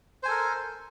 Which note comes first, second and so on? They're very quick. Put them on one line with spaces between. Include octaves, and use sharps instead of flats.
C5 G#5 A4 A#4